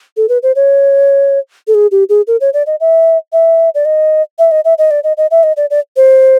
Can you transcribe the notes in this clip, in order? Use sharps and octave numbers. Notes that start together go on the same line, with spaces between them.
A4
B4
C5
C#5
A4
G#4
G4
G#4
A#4
C#5
D5
D#5
E5
E5
D5
D#5
E5
D#5
E5
D#5
D5
D#5
D#5
E5
D#5
D5
D5
C5